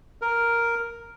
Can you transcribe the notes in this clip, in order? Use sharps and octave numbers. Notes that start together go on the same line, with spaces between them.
A#4